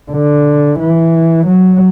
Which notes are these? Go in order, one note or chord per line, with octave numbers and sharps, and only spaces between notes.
D3
E3
F#3